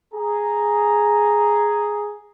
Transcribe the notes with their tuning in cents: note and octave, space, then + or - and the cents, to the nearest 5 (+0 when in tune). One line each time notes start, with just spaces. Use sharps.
G#4 +0 A#5 +0